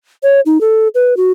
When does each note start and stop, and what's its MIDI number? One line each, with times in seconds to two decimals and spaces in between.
0.23 0.40 73
0.46 0.60 63
0.61 0.88 69
0.95 1.16 71
1.17 1.32 66